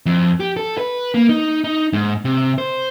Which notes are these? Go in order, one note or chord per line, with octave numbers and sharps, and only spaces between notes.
F2
G4
A4
B4
A#3
D#4
D#4
G#2
C3
C5